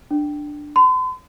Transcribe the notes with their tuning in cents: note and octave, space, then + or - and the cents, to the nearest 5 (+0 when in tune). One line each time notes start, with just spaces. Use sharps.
D4 +10
C6 -45